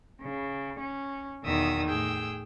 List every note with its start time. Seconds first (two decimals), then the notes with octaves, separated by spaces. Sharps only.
0.22 C#3
0.79 C#4
1.42 E2 B2 D#3 E5 D#6 E6
1.85 A2 G#4 G5 E6